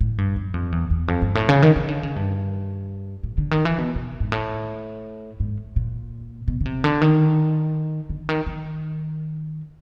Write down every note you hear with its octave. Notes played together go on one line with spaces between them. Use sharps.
A2
G2
F#2
F2
E2
E2
F2
G2
A2
C#3
D#3
D#3
D3
C#3
G2
A2
D3
D#3
E3
B2
B2
G#2
A2
G#2
A#2
B2
C#3
C3
D3
D#3
D3
D#3
D#3